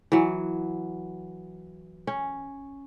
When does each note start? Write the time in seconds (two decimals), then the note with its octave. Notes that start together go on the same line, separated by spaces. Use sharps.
0.12 E3 F#3
2.07 C#4